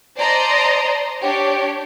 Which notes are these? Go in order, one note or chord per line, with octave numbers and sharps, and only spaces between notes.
C5 D5 D#5 A5 A#5 C6
D4 G4 C#5